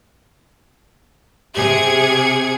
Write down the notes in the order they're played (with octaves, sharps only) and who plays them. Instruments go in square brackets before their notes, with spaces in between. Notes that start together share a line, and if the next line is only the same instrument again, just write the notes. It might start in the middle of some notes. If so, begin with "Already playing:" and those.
[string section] C3 G#4 G#6 [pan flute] G4